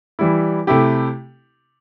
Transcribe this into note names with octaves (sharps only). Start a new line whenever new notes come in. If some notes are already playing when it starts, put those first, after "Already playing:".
E3 G3 E4
C3 A3 E4 G4